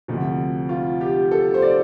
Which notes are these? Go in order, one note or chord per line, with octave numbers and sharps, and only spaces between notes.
D2 C3 F3
F4
G4
A4
C5
D5